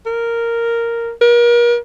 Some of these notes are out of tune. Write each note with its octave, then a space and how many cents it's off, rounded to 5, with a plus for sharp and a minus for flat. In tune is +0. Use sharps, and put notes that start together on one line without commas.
A#4 -5
A#4 +35